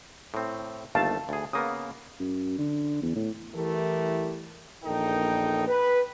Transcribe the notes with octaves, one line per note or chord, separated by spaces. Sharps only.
A2 C4
G1 D#2 A3 F5 A5
D2 G#4
C#3 A#3 B3 D#6
F#2
D3
E2
A2
E3 G3 A3 E4 G4 A#4
A#1 E2 D#4 A4 A#4 G5
B4